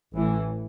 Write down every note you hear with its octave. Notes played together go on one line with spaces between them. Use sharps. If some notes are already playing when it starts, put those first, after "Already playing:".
A1 A2 E3